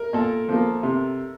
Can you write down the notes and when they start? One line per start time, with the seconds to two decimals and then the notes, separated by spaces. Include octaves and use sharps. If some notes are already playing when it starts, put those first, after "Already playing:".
Already playing: A#4
0.13 A#2 A4
0.48 F3 A#3
0.83 C3